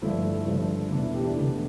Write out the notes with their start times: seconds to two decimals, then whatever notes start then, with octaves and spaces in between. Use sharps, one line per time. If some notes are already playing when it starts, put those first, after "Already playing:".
0.02 G1 G2 F3 A3 E4
0.46 G1 G2 F3 A3
0.91 E2 B2 A3 D4
1.02 E4
1.14 E4 G4
1.25 D4
1.35 E2 B2 A3 E4